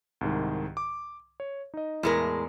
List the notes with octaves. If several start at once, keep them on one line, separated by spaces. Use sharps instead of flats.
C2 G#2 D#3
D6
C#5
D#4 D#5
E2 A2 G#3 A#4